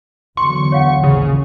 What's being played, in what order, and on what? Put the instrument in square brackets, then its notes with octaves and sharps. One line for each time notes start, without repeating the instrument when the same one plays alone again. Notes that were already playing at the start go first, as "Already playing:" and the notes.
[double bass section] E2 D3 F#3 [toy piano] C6 [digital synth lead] C#6
[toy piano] C#5 F5 F#5
[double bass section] A1 D#2 F3 [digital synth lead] C#3